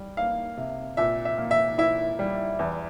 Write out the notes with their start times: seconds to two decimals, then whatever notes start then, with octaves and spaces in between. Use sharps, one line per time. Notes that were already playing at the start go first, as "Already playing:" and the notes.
Already playing: G3
0.17 A#3 F5
0.57 C3
0.97 A#2 E5
1.25 E5
1.38 A#3
1.51 E5
1.78 E4 E5
2.19 G3
2.59 E2